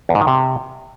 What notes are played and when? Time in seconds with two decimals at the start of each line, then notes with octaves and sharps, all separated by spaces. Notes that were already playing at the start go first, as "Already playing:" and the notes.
0.09 E2
0.15 G#2
0.21 D#3
0.27 C3